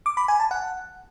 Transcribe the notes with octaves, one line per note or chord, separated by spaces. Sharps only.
D6
B5
G#5
A5
F#5